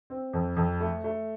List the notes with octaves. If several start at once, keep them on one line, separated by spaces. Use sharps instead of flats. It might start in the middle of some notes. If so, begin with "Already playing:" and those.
C4
F2
F2
A3
A3